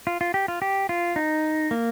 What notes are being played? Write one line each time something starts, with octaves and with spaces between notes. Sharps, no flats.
F4
F4
G4
F4
G4
F4
D#4
A#3